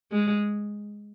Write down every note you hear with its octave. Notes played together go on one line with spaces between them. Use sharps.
G#3